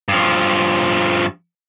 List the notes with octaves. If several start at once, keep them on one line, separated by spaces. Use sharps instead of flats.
G2 F3